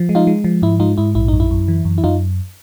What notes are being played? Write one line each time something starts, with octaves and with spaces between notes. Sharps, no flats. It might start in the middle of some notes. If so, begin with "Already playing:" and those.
Already playing: F3
G#3
D#4 F4
G#3
F3
G#2 E4
G#3 D#4 F4
G#2 E4
A#1 E4
F#2 D#4
E4
F#2
E3
F#2
E4
F#2 D#4 F4